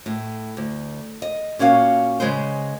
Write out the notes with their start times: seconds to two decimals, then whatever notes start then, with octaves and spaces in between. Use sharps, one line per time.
0.06 A2
0.57 D2
1.22 D#5
1.59 A#2 C#4 F#4 D5 F5
2.20 C#3 G#3 G#4 B4 C5